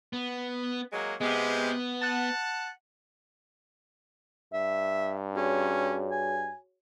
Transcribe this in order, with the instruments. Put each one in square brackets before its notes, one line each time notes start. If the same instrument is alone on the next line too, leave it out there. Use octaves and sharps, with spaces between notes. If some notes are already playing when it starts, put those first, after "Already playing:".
[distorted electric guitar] B3
[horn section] F#3 G#3 A#3
[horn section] C3 G#3 G4 [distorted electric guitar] B3
[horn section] F#5 A5
[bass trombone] G2 [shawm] E5
[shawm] C#4 [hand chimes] F#4 G#4 C#5
[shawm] G#5